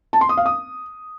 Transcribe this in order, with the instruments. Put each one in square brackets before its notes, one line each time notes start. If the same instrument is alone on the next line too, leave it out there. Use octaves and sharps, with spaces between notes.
[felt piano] A5
C6
D#6
F5
D#6